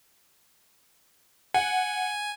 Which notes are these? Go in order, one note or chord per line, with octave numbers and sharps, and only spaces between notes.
F#5 G#5